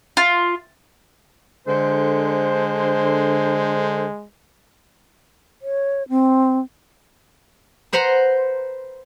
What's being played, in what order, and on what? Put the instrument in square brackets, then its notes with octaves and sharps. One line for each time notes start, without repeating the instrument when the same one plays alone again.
[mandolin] F4
[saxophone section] D3 C5 [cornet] G#3
[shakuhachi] C#5
C4
[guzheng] B4 C5 F#5 A#5 C6